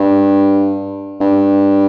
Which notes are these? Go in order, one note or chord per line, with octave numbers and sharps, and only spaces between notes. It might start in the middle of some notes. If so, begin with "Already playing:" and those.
Already playing: G2
G2